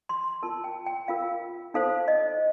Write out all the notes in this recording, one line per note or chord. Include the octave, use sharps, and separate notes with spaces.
C6
F4 A#4 A5
G5
G5
F4 A#4 F5
D#4 A4 C5 F5
D#5